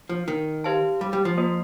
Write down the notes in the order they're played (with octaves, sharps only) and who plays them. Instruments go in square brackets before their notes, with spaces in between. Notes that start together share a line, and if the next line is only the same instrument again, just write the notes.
[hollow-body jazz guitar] F3
D#3
[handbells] G4 C5 F5 A5
[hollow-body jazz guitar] G3
G3
F3
[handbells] A#3 F4 C5